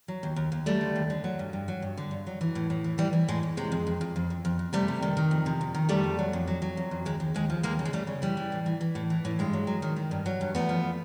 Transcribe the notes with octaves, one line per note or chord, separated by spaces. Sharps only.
F#3
D#2
D#2
D#2
F#3 G3 A3
D3
D#2
D3
F#3
G2
G2
F#3
G2
D3
G2
F#3
E3
A2
A2
E3
E3 G3
E3
A2 G#3
A2
C3 G#3
F2
F2
F2
F2
F2
F2
F2
C3 G3 A3
C3
D#3
D#3
F2
C3
F2
D#3
F2 G3 A3
F2
F#3
F2
F#3
F#3
F2
F2
D#2 G#3
D#2
D#2 G#3
F3
D#2 G#3 A#3
C#3
G#3
C#3 G3 A3
C#3
E3 G3
E3
A2
E3
E3
A2
E3
A2
G2 G#3
F#3
F#3
D#3
D#3
G2
F#3
G2
E2 A3 B3
F3